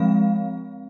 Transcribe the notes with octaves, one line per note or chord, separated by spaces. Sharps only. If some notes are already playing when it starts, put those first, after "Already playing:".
Already playing: F3 G#3 C4 F5